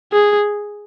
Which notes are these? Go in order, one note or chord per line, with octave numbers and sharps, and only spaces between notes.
G#4